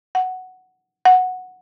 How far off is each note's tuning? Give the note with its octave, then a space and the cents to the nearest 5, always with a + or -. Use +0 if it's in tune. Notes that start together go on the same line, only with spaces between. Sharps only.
F#5 +5
F#5 -5